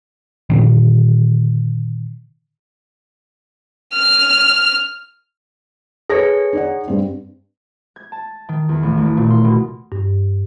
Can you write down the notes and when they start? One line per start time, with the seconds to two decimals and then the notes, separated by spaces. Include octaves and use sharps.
0.50 A#2 D3 D#3
3.94 F6
6.10 G#4 A4 B4 C#5 A#6 C#7
6.53 D#4 D5 F#5
6.88 G2 C4
7.96 G#6
8.12 A5
8.49 D#3
8.69 E2
8.83 A1
8.98 D2
9.17 A#2
9.30 C6
9.44 B2
9.92 G2